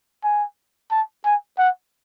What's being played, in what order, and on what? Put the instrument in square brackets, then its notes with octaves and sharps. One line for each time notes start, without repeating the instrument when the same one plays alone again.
[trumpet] G#5
A5
G#5
F#5